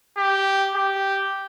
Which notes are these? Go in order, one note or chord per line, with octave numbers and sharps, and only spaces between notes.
G4
G4